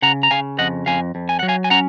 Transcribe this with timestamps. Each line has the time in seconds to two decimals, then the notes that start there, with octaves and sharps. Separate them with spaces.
0.02 C#3 F#5 A#5
0.23 A#5
0.31 C#3 F5 G#5
0.59 F2 D#5 F#5
0.86 F2 F5 G#5
1.15 F2
1.29 G#5
1.39 F#3 F#5
1.48 F5 G#5
1.64 G#5
1.70 C#4 F#5 A#5